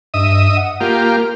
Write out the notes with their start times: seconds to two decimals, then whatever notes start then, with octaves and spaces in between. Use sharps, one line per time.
0.14 G2 D#5 E5 D#6
0.56 F#5
0.81 A#3 F4 G4 A#4